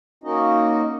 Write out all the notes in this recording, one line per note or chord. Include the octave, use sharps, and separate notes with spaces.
A#3 C#4 D#4 F#4 D#5